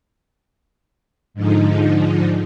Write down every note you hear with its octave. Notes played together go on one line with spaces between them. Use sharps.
G#2 D3 F3 D#4